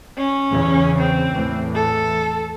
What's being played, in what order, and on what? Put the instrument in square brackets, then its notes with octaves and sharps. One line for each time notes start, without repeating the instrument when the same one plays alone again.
[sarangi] C#4
[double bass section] E2 C#3
[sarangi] C4
[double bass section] E2 A2 E3
[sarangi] A4